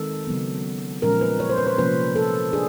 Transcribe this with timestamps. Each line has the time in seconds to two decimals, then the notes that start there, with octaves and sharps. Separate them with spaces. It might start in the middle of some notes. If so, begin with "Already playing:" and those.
Already playing: D#3 G#3 C4 D#4 A4
0.27 C#3 F#3 B3
1.02 A#2 F3 G#3 C#4 A#4
1.21 B4
1.40 C#5
1.50 C5
1.58 B4
1.67 C5
1.78 C3 F3 A#3 C#4 B4
2.16 A4
2.53 D4 G#4